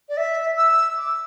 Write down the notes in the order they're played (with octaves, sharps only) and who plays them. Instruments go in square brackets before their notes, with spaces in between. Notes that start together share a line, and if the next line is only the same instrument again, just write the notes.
[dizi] D5
E5
E6
D6